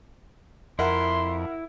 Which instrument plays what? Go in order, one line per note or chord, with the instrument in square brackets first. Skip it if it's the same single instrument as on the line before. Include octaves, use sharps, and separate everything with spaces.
[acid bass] F2 [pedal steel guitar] E4 [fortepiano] A#4 E5 F#5 [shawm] C6